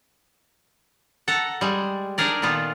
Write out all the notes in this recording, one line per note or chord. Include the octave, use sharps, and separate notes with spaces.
A4 F#5 A5 A#5
G3 G#3
D4 D#4 G#4 A#4 D5
A#2 D#3 B3 F4 A4